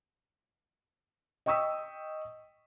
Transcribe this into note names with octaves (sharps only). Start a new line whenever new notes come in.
D#5 G5 C#6 D#6 E6 B6